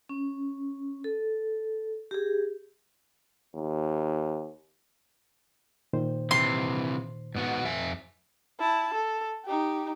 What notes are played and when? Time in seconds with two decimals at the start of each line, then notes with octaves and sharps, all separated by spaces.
0.09 C#4
1.04 A4
2.11 G4 G#4
3.56 D#2
5.93 A#2 D#3 C5
6.31 C3 E3 C6
7.35 G#2 B3 F#4
7.65 F2 E5 G#5
8.60 E4 A5
8.94 A4
9.45 D#4 G4